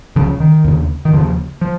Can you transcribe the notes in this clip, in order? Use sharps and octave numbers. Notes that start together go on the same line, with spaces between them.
C#2 C#3 F3
D#3
D#2 C#3
D#3
D#2 C#3 F3
F3